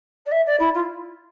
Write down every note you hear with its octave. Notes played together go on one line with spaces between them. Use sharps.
D5
E5
D5
E4
F4